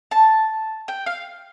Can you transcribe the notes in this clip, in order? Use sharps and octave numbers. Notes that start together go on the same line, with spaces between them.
A5
G5
F5